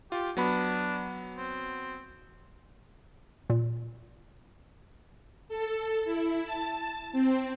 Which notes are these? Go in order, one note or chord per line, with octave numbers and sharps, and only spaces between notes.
F4 G4
F#3 B3 D4 B5
C4
A#2
A4
E4
A5
C4